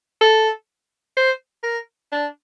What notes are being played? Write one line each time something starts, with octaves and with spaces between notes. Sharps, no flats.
A4
C5
A#4
D4